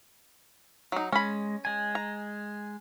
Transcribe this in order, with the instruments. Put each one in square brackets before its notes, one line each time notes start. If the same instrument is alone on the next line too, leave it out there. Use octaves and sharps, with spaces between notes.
[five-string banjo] F#3 D#4
[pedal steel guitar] G#3 [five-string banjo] C#4 B5
[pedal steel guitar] G#3 G#5
[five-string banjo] A#5